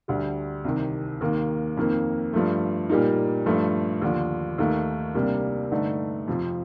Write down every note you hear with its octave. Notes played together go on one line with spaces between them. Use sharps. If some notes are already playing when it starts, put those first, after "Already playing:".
D2 D3 G3
C2 C3 D#3
D#2 D#3 A#3
F2 D#3 A#3
G2 F3 A3
A#2 G3 A#3 D#4
G2 F3 A3
D#2 D3 F3
D#2 D#3 A3 D#4
C2 C3 G3 A#3 D4
G2 D3 A3 D#4
F2 C3 F3